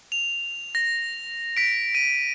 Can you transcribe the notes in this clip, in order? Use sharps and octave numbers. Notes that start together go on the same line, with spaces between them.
F7
A#6
B6 D7
D#7